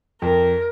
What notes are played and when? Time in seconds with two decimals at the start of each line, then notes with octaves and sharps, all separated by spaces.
0.21 F2 A#4